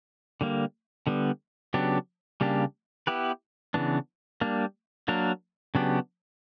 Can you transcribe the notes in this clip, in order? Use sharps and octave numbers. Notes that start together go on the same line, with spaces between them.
D3 G3 A#3
D3 G3 B3
C#3 F#3 B3 D4 G4
C#3 G3 A#3 D4 G4
B3 E4 G4 B4
C#3 E3 B3 D4
G3 A#3 D4
F#3 A#3 D4 A#4
C#3 F#3 B3 D4 G4